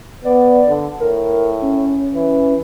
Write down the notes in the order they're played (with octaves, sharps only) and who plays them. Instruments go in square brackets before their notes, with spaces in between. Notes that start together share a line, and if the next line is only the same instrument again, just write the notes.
[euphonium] B3 [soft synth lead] D5
[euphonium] D3
[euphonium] A2 [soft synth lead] A#4
[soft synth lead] C#4
[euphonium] E3